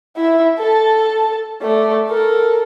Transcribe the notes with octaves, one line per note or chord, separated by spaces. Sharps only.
E4 E5
A4 A5
A3 D5
A4 A#4